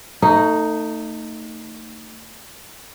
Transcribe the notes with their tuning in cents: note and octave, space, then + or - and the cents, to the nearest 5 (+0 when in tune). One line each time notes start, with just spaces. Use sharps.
A3 +35 D#4 +0